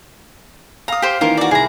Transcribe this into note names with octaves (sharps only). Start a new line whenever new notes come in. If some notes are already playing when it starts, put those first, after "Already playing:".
F5 A#5 D#6
G4 C5
D#3 E3 A#3 F4 A#4
F#4 D5
C2 G#4 A#5